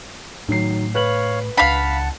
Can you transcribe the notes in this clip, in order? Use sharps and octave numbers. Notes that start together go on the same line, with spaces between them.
A2 D#3 F#3 C7
B4 C#5 F5 F#7
C#2 D4 F5 F#5 A5 B5